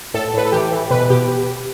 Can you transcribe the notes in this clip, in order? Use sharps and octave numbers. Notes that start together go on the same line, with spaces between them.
A2 A4
A2 B4
A4
E3 G4
E3
B2 B4
B2 G4